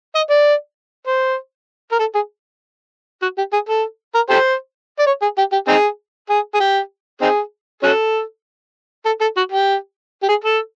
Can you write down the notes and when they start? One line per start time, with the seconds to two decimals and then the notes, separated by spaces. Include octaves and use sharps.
0.15 D#5
0.30 D5
1.07 C5
1.92 A#4
1.99 A4
2.15 G#4
3.22 F#4
3.38 G4
3.53 G#4
3.69 A4
4.15 A#4
4.30 G4 A4 C5
4.99 D5
5.06 C#5
5.22 G#4
5.38 G4
5.52 G4
5.68 C4 D#4 G#4
6.30 G#4
6.54 G#4
6.60 G4
7.21 C4 D#4 G#4
7.83 C#4 F#4 A4
9.06 A4
9.21 A4
9.37 F#4
9.52 G4
10.23 G4
10.29 G#4
10.44 A4